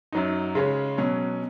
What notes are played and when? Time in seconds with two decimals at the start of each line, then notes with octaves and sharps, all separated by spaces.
0.12 F#2 F#3 D#4
0.55 C#3 G#3 C#4
0.98 B2 F#3 C#4